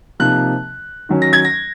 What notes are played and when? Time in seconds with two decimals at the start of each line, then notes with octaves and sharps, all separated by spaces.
0.20 C3 F3 A#3 D#4 F#6
1.09 D#3 F#3 C#4
1.22 A#6
1.33 G#6
1.45 A#6